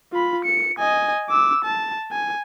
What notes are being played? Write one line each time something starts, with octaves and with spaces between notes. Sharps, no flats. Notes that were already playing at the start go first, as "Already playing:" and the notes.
F4 B5
C#7
D#5 G#5
D6 E6
A5
G#5